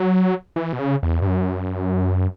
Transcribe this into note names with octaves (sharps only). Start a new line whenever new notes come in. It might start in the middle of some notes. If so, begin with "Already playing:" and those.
Already playing: F#3
E3
B2
C#3
E2
G2
F#2